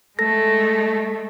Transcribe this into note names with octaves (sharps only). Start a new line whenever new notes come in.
G#3 A3 A4 A#6